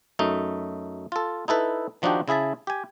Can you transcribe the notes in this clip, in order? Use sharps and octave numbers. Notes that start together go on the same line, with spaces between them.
F#2 A3 D#4
F4 A4
D#4 E4 A4 B4
D#3 F3 D4 D#4 F#4 G4
C#3 E4 G#4 E5 A5
G4 G#5